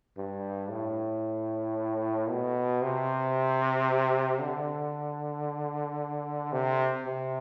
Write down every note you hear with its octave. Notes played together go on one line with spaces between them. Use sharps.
G2
A2
B2
C3
D3
C3
C3